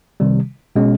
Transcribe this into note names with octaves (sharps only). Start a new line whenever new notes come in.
C3 D#3 G3
B2 G#3 C#4